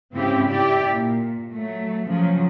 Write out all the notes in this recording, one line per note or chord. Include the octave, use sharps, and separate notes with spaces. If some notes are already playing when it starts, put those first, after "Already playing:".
G#2 C#3 C4 E4 G4
E4 G4 D5
A#2
F#3 A3
C#3 F3 F#3